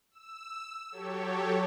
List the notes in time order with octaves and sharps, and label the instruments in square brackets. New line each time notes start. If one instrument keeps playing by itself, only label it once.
[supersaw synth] E6
F#3 G4 A4 C#5